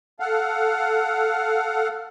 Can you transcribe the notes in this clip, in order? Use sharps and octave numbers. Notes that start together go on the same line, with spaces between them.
A4 F5 F#5